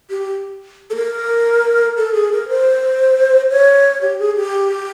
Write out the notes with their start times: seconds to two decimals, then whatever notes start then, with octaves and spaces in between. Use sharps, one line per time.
0.10 G4
0.90 A4
0.95 A#4
1.97 A4
2.14 G#4
2.32 A#4
2.49 C5
3.50 C#5
4.02 G4
4.19 G#4
4.36 G4